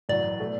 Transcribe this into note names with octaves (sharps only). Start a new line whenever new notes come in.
A1 A2 F#3 D5
B2 A3